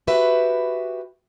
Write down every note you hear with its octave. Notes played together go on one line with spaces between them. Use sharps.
F#4 G4 B4 E5